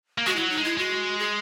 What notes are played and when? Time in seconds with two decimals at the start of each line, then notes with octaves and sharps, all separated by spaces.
0.18 A#3
0.26 G#3 F#4
0.36 F#3 E4
0.50 D#4
0.57 G#3
0.64 E4
0.77 G#3 F#4
1.19 G#4